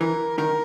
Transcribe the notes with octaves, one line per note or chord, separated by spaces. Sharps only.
E3 A#4
D#3 A#4